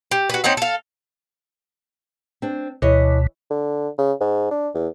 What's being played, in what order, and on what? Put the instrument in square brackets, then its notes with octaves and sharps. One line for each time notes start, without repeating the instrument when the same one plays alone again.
[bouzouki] G4
F#4 B4
C4 C#4 D#4 F#5
A4 F5
[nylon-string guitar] C4 D4
[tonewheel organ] D2 B2 [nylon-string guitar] E3 C#5 D#5
[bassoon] D3
C#3
G#2
D4
E2